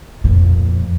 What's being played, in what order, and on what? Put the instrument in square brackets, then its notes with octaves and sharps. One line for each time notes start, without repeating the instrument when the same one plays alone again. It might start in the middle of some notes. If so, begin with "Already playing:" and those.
[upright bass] F2 A#2